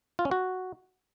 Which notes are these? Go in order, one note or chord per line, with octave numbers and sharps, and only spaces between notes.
F4
C#4
F#4